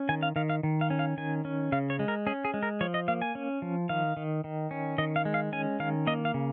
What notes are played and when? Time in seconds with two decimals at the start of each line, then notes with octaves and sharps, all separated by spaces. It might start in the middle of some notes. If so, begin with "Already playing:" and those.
Already playing: C#4
0.09 D#3 G#5
0.23 F5
0.36 D#3 F5
0.49 F5
0.63 D#3
0.81 F5
0.90 C#4
0.99 F5
1.17 D#3 G#5
1.45 C#4
1.72 C#3 F5
1.90 C#5
1.99 G#3
2.08 A#4
2.27 C#4 G#4
2.45 G#4
2.54 G#3
2.63 A#4
2.81 F3 C#5
2.94 D#5
3.08 A#3 F5
3.22 G#5
3.35 C#4
3.62 F3
3.89 D#3 F5
4.17 D#3
4.44 D#3
4.71 C#4
4.98 D#3 D#5
5.16 F5
5.25 G#3
5.34 F5
5.53 C#4 G#5
5.80 D#3 F5
6.07 A#3 D#5
6.25 F5
6.34 C#3